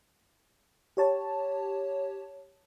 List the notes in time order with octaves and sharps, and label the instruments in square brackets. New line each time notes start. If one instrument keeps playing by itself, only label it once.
[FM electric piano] G4 C#5 A5